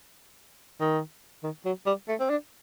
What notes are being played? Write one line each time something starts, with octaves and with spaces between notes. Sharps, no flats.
D#3
D#3
F#3
G3
A3
C4
D4